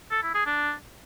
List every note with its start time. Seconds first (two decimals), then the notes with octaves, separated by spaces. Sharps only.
0.11 A4
0.23 E4
0.35 G#4
0.46 D4